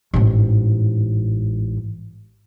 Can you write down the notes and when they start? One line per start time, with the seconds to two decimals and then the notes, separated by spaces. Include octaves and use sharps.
0.14 A1 G#2